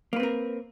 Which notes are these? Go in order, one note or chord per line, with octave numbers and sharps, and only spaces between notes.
A#3 C4 A#4 B4